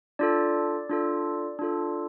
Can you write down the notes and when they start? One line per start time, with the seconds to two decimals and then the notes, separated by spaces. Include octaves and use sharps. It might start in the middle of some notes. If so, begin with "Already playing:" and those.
0.19 D4 F4 A4 D5
0.89 D4 F4 A4
1.59 D4 F4 A4